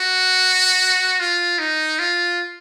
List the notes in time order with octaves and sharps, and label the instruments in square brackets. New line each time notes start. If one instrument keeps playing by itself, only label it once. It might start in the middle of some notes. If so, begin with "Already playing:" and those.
Already playing: [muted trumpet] F#4
F4
D#4
F4